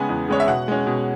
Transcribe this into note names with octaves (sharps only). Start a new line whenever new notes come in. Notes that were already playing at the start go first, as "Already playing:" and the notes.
Already playing: C#3 G#3 B3 F#5 G#5
E2
C#3 G#3 B3 C#5
E5
B2 F#5
G#3 C#4
B2